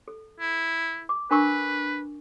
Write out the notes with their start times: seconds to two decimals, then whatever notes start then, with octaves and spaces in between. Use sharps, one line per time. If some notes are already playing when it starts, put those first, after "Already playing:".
0.08 A4
0.40 E4
1.09 D6
1.31 D4 A#4 B4 C#6